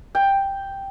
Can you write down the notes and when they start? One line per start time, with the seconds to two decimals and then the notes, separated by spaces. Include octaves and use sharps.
0.15 G5